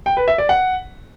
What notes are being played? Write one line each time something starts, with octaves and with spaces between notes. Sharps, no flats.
G5
B4
E5
D5
F#5